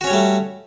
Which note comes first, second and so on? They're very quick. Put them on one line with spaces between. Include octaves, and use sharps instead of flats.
F#4 C#4 C#5 G3 A3